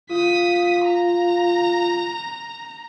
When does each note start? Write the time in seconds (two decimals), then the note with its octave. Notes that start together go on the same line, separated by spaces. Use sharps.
0.11 F4 D#6 B6
0.86 A#5